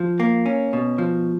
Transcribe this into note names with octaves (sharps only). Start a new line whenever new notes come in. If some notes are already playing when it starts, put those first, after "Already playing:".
Already playing: F3
A#3
C#4
B2
F3